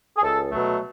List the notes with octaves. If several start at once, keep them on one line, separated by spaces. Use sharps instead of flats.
G#4
C#2 A4
B2 F#3 A3